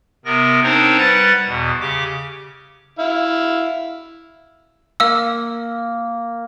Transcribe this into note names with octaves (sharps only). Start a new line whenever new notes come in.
C3 B3 A#4 A#6
C4 D4 D#4 A#4 C5 C#5
G3 B4 F#5 F#6 G#6 A6
E2 B2
C#3 G4 D6
E4 F5
A#3 F5 E6